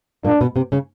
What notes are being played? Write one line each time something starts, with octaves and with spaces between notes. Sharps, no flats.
A#2 A#3 D4
B2 B3
C3 C4
C#3 C#4